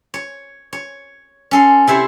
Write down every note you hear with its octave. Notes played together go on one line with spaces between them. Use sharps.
C#5
C#5
C#4 A4 C6
C3 E4 C5 C#5